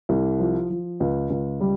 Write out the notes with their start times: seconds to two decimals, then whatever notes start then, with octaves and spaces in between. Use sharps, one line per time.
0.09 C2
0.39 F3
0.70 F3
1.00 C#2
1.30 C#2
1.61 G3